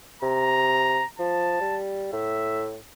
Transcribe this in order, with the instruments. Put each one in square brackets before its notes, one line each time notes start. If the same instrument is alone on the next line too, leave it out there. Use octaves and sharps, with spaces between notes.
[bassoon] C3 [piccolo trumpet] A#5
[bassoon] F3 [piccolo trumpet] A5
[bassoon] G3
[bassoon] A2 [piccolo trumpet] E5